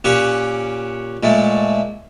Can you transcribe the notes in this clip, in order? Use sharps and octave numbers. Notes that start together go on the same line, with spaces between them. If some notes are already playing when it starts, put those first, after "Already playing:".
A#2 C#4 G4 F#5 C#6
A#2 G#3 A3